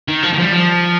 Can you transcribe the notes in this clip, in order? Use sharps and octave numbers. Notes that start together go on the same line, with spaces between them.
D#3
F3
D#3
F3
G3
F3